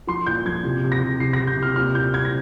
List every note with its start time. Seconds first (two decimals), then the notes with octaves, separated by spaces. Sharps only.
0.07 F3 C6
0.26 A#2 G6
0.46 F3 G#6
0.63 C3
0.83 C3
0.92 A#6
1.02 C3
1.19 C3 C7
1.33 C3 A#6
1.47 G6
1.57 C3
1.63 F6
1.76 A#2 F6
1.95 A#2 G6
2.13 C4 G#6
2.25 A#6